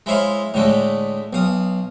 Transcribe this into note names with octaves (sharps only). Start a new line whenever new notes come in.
G#3 E4 C5 C#5 F5
A2 D3 G#3 A3
B1 F5 D#6